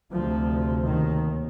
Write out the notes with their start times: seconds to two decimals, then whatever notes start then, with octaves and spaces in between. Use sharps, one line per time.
0.13 D2 C3 F3
0.85 D#2 D#3